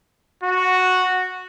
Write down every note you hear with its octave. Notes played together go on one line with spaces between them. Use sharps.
F#4